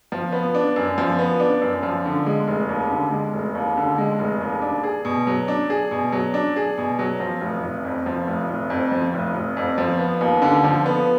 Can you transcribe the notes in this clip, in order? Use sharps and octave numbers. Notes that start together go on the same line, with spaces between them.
F3
B3
D4
F#2
F3
B3
D4
F#2
F3
D3
G#3
F1
D#2
D3
G#3
F1
D#2
D3
G#3
F1
D#2
D4
G#4
B2
F#3
D4
G#4
B2
F#3
D4
G#4
B2
F#3
F3
F1
F1
F2
F3
F1
F1
F2
F3
F1
F1
F2
F3
B3
D#2
D3
F3
B3